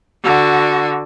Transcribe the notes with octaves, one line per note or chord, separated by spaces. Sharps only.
D3 F#4